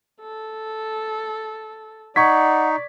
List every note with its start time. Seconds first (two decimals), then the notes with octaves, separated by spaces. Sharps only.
0.21 A4
2.16 D#4 D5 F#5 C#6 G#6 B6